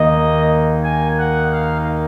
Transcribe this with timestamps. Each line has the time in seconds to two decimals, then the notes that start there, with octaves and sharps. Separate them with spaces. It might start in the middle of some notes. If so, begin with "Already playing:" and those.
Already playing: D#2 D#3 A#3 D#4 D#5
0.84 G#5
1.19 F#5
1.53 F5